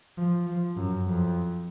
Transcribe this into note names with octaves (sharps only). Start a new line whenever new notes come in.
F3
F3
F#2
F2